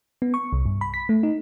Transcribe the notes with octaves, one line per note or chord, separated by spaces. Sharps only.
B3
C#6
C2
G2
B5
B6
A3
D#4